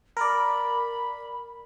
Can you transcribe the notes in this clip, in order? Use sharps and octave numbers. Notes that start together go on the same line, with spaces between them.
A#4 D5 B5